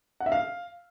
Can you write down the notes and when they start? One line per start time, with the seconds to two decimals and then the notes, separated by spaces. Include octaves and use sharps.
0.20 F#5
0.26 E5
0.32 F5